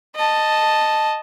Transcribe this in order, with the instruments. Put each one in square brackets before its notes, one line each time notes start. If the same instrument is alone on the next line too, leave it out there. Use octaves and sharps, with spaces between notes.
[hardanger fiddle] D#5 A5